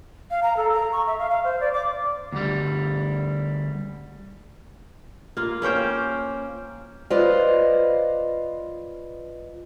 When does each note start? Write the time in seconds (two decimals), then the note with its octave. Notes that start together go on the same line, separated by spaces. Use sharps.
0.31 F5
0.43 A#5
0.57 A4
0.72 A#5
0.92 C#6
1.07 E5
1.19 F5
1.30 F5
1.44 C5
1.61 D5
1.73 D6
2.32 D2 G3
5.37 A#3 F4
5.62 A#3 C#4 C5 G5
7.10 F4 B4 C5 D5 D#5 F5